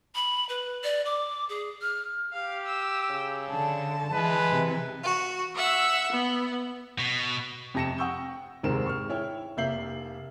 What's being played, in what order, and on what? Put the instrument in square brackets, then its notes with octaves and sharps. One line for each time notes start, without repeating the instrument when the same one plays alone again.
[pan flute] B5
B4
D5
D6
G#4
F6
[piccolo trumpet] G4 [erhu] F5
[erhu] E6
[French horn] C#3
[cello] D3 [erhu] A5
[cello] E3 [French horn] G#3 [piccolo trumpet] B4
[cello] C3 E3
[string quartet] F#4
E5 F#5 E6
B3
[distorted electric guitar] B2
[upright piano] F2 C3 A5 A#6 C#7 E7
F#5 G5 C#6 D#6 E6 G6
F1 D#2 G#2 C4 A#4 E7
C#6 F6
E4 C#5 G5
F1 A#3 E5 G6 C7 F#7